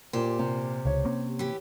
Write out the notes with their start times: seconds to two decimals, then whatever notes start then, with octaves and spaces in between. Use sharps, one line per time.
0.13 A#2 G4 C5
0.39 C3
0.85 C#2 C#5
1.05 A#3 C4 C#4
1.39 E3 G4